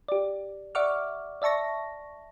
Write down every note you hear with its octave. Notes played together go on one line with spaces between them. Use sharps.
G4 D5
D5 E5 F#5 C#6 D6 F6
D5 E5 A5 C#6 A#6